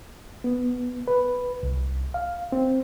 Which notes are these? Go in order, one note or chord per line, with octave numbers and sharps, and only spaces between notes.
B3
B4
C2
F5
C4